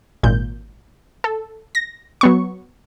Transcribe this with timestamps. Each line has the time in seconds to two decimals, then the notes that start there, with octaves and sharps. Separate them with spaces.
0.23 G#1 A#2 G6
1.24 A4
1.75 A#6
2.21 F#3 B3 C#6